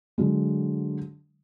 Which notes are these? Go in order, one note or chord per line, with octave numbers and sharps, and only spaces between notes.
D3 F#3 G#3